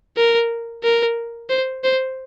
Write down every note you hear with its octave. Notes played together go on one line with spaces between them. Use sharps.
A#4
A#4
C5
C5